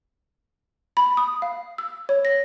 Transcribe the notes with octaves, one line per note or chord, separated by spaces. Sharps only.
B5
D#6
F5
E6
C#5
A#6